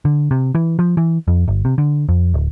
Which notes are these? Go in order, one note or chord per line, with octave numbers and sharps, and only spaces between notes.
D3
C3
E3
F3
E3
F2
G1
C3
D3
F2
D1